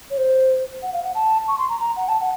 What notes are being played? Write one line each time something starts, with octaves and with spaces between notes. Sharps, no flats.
C#5
C5
F#5
F5
F#5
A5
C#6
C6
A#5
A#5
F#5
A5
F#5